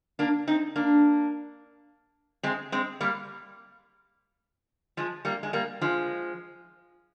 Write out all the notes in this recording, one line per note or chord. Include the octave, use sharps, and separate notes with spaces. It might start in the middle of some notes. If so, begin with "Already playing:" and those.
A#3 D4
C4 D#4
A#3 D4
G#3 C4
G#3 C4
G3 A#3
F3 G#3
G3 A#3
G#3
G3 A#3
F3 G#3